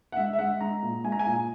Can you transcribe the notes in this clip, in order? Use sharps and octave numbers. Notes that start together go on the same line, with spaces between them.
F#5
G#3 E5
E5
G#3 F#5
G#3 A#5
A#2
G#3 G#5
A#5
G#5
A#2